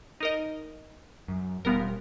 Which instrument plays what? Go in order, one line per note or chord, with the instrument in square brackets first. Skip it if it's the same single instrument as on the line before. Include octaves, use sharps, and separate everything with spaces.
[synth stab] D#4 A#4 D#5
[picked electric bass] F#2
[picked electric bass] E1 G3 [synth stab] F3 B3 A#4